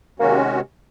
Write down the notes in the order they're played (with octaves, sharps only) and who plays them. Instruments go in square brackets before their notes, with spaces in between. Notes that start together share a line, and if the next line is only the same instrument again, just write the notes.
[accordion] C3 D#3 G#3 C#4 F#4 [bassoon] A#3